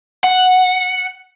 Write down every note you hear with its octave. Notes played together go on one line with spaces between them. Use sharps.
F#5